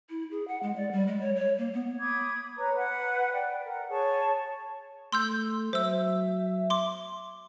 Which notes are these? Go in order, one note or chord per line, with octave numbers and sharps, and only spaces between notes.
E4
G#4
F#5
G#3
D5
G3
G#3
C#5
C#5
A#3
B3
B5 D6 D#6 G#6
B4 C#5 A#5 B5
B4 F#5
D5 G5
A#4 F#5
G#4 C#5 A5 C#6
A3 C6 E6 G6
F#3 C5 E5 E6
C6 D6